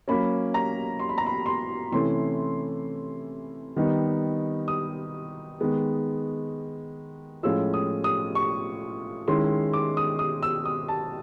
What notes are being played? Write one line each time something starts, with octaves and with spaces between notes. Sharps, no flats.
F#3 A#3 C#4 B5
A#5
C6
B5
A#5
B5
C6
C3 E3 A3 C#4 E4 C6
D#3 G3 B3 D#4
D#6
D#3 G#3 B3
A2 F3 G#3 C#4 F4 E6
D#6
D#6
C#6
D#3 G#3 C#4 E4 C6
D6
D#6
D#6
E6
D#6
A5